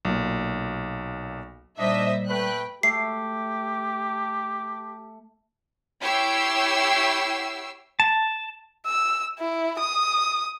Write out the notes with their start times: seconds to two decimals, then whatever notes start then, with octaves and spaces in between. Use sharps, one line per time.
0.05 B1 A#2
1.79 A#2 G3 D4 D#4 C5 D#5 E5
2.28 A3 B4 G5 F#6
2.83 A3 G4 C7
6.01 E4 G4 C#5 G5 E6 C7
8.00 A5
8.86 E6
9.39 E4
9.79 D#6